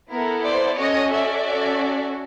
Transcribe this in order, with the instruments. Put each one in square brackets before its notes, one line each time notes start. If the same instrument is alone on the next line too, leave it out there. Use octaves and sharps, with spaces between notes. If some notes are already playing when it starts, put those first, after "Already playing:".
[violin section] B3 E4 A4 A#4
C5 D5
C#4 F#4 A4 C#5 D#5
D5 E5
C#4 F#4 A4